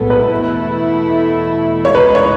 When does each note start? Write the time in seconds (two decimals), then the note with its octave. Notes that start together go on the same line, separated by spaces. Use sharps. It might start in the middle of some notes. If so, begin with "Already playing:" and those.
Already playing: B1 A2 G#3 B3 A4
0.10 B4
0.31 E2 B2 A3 E4
1.85 C#5
1.94 C#2 C#3 G#3 D#4 B4
2.15 C#5